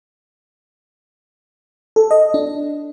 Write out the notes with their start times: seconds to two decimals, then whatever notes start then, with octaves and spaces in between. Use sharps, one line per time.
1.96 A4
2.11 D#5
2.34 D4